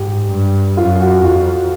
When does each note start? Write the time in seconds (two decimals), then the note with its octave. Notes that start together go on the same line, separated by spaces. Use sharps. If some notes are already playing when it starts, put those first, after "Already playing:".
Already playing: G#2 G4
0.30 G2
0.77 F#2 F4
1.00 F#4
1.23 F2 F4